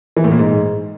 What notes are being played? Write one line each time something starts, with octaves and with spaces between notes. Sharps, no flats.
E3
A2
A#2
G#2